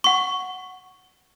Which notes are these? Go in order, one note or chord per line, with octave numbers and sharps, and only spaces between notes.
F#5 C#6